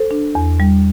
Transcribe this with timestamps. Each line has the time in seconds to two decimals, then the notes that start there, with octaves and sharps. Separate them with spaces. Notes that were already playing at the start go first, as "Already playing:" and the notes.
Already playing: A4 C5
0.11 D4
0.35 E2
0.60 G3